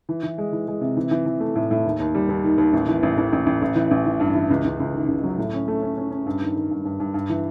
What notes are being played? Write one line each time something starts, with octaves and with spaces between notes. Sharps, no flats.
E3
E3
G#3
E3
G#3
C3
E3
E3
E3
A3
A2
A2
D#2
D#2
G3
D#2
D#3
D#2
A1
E3
A1
A1
A1
A1
A1
E3
A1
E3
G2
E3
C#2
C#2
C#2
D#3
C#2
F#3
A2
C#4
A3
C#4
C#4
C#4
G2
D#3
D#3
G2
G2
G2
G2
E3